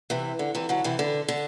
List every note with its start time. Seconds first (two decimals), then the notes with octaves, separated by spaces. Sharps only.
0.10 C3 E3
0.39 D3
0.55 C3 E3
0.69 D3 F#3
0.84 C3 E3
0.99 D3
1.28 D3